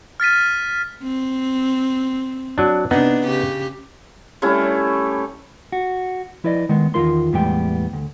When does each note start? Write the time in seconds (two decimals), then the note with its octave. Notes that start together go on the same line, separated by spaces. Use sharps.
0.20 F6 A6 B6 D#7
1.03 C4
2.58 F#3 D4
2.91 C3 B3 D4 D#4
3.23 C#3 G4
4.42 G3 A3 C#4 E4
5.72 F#4
6.44 F3 E4 B4 D5 D#5
6.69 D#3 G#3 B3
6.94 E2 D#3 F4 A#4 C6
7.33 E2 A2 G3 G#3 B3 G5
7.93 D2